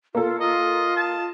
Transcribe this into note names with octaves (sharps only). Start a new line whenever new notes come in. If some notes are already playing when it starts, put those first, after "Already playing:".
A#3 F4 A4
F4 D#5
A5